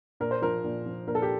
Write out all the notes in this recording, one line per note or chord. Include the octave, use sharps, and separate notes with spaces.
A#2 A#4
C5
F3 A#4
A#2
F3
A#2 A#4
A4
G4